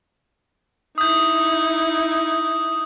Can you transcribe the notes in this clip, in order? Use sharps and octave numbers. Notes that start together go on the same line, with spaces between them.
D#4 E4 D#6 G6